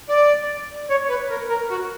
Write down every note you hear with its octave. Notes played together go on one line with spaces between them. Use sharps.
D5
C#5
B4
A#4
A#4
F#4